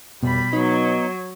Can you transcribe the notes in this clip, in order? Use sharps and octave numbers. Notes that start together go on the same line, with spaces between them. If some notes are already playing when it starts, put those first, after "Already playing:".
F1 B2 G3 B5
F#3 B3 D#4